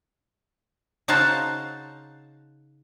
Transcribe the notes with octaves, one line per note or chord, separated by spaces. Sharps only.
C#3 D#4 F#4 C5 F5 A5